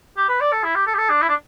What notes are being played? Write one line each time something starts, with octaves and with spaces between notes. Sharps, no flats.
G4
B4
D5
A4
E4
G4
A4
G4
A4
D4
E4
D4